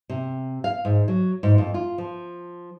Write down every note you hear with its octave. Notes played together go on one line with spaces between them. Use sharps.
C3
F5
G#2
F#3
G#2
F2
F4
F3